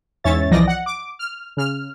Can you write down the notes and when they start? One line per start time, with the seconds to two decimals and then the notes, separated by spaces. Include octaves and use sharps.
0.24 E2 G#2 C#4 C#5 E5 A6
0.51 C2 E3 F3 D5 D#5 A#6
0.68 F#5
0.86 D6
1.19 F6
1.57 C#3 F6